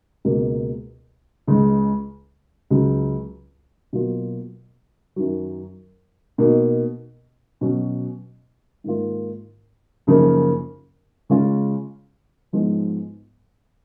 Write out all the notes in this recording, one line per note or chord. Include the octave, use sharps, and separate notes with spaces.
C#2 B2 A#3
C#2 C#3 G#3
C#2 C#3 F#3
B2 F#3 A#3 F4
F#2 D#3 F#3
B2 A#3 D#4
B2 F#3 C#4
G#2 D#3 A#3 F4
F#2 C#3 F3 A#3 D#4
C#3 G#3 C#4 F4
G#2 F3 G#3 B3 D#4